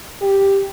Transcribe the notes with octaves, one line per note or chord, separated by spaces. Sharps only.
G4